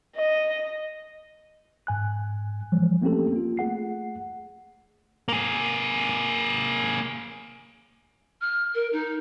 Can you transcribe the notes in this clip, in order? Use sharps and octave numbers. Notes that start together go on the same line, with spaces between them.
D#5
G#2 G#5 F#6
E3 F3 G3 G#3
A3 A#3 C4 C#4 G4 A4
A#3 F4
A3 G#4 F#5 C7
A#3 G#4
F6
A#4
D#4